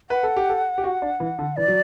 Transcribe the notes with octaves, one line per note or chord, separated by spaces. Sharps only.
B4 F#5
A4
G4
A4
G4
F#4
D4
E3
D3
E3 D5
F#3